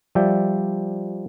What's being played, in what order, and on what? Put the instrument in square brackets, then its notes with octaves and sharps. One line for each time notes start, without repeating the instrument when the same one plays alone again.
[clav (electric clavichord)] F3 G3 D5 E5 G5